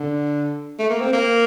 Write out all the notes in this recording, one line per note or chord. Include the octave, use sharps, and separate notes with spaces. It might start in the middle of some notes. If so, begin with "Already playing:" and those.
Already playing: D3
A3
A#3
C4
A#3